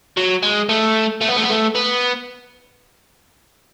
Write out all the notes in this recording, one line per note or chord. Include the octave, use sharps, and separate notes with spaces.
F#3
G#3
A3
A3
B3
A3
B3
A3
B3